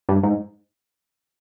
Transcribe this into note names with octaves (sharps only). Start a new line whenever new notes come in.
G2
G#2